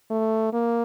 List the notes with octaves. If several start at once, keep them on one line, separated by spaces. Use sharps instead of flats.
A3
A#3